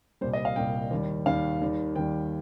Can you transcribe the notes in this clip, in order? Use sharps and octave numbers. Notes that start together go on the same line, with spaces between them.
C2 A#2 G3 C5
D#5
F5
C2 A#2 G3 G5
D#2 D#3 G3
D#2 D#3 G3 F5
D#2 D#3 G3
D#2 D#3 G3 G5